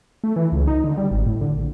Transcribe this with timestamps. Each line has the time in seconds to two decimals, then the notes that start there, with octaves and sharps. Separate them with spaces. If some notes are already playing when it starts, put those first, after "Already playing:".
0.24 A3
0.36 E3
0.52 C#2
0.68 D#4
0.84 D3
0.98 G3
1.11 G#1
1.26 A2
1.41 D3
1.58 A#1